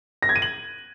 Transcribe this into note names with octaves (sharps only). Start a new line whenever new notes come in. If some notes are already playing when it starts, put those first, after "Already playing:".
A#6
G#6
D#7
F#7